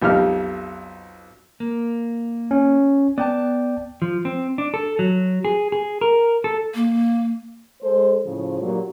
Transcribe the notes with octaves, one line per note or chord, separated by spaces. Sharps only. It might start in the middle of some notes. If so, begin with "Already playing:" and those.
B1 F2 G4 F6
A#3
C#4
B3 D5 G5 A5
F3
C4
D4
A4
F#3
G#4
G#4
A#4
A4
A#3
G#3 A4 C5
A2 C#3 F3
G2 A#2 F#3